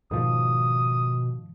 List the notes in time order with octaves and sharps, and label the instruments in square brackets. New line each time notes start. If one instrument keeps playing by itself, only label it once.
[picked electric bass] G#2 D#3 F3 [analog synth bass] B2 [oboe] D#6